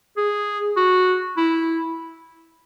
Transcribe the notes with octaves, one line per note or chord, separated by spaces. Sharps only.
G#4
F#4
E4